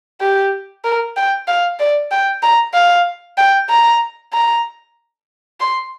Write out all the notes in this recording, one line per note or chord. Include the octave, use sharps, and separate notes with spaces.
G4
A#4
G5
F5
D5
G5
A#5
F5
G5
A#5
A#5
C6